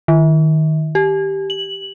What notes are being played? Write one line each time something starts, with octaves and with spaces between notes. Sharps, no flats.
D#3
G4
F#7